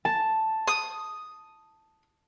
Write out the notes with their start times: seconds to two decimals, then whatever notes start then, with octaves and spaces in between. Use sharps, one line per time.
0.05 A5
0.67 D#6